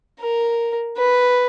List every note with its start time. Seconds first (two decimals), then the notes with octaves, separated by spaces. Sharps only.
0.20 A#4
0.98 B4